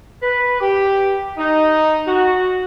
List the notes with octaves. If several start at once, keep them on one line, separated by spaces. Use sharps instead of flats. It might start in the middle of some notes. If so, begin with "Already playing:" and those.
B4
G4
D#4
F#4